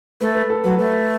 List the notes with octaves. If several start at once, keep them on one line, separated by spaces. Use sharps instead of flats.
A3 B4
B4
A4
F#3 B4
A3 B4